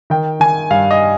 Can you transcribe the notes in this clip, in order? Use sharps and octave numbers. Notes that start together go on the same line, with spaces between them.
D#3 G5
D#3 G#5
G2 F5
D#5